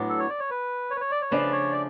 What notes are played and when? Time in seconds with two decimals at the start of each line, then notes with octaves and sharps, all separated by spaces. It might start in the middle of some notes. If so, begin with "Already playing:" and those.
Already playing: A2 F#3 B3 D4
0.09 A4
0.19 C#5
0.29 D5
0.40 C#5
0.50 B4
0.90 C#5
0.96 B4
1.01 C#5
1.11 D5
1.22 C#5
1.31 C#3 F3 A3 D4 B4
1.52 C#5
1.72 D5